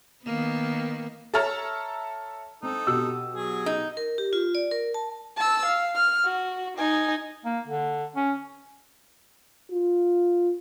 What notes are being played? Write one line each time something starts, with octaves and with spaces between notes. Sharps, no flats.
D#3 A#3 B3
A4 C#5 E5 A5 A#5 F6
C4 D#4 A4
B2 G4 E6
F#3 G#4
D#4
A#4
G4
F4
D5
A#4
A5
A5 E6
F5
F6
F#4
D#4 G#5
A#3
D3
C#4
F4